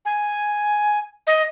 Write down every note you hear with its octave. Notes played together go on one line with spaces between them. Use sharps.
G#5
D#5